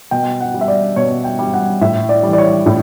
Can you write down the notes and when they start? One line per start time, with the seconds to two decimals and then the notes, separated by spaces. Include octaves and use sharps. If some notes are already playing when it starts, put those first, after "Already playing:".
0.11 B2 G5
0.40 F#5
0.54 G3
0.61 E5
0.68 D5
0.96 B2 C#5
1.24 G5
1.39 G3
1.54 F#5
1.81 A2 E5
2.09 D5
2.23 E3 G3
2.33 D5
2.38 C#5
2.66 A2